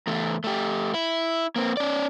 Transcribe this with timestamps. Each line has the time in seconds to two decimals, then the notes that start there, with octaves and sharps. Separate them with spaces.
0.07 E2 A3
0.44 A3 G4
0.94 E4
1.56 A#3 C4
1.77 C#4 D5